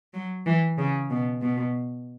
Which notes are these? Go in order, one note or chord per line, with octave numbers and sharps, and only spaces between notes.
F#3
E3
C#3
B2
B2